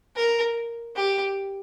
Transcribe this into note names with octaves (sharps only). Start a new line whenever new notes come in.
A#4
G4